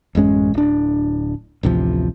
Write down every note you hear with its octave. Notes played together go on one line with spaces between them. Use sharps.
A1 F#2 G#3 C#4
D1 D4
A1 D2 C3 F3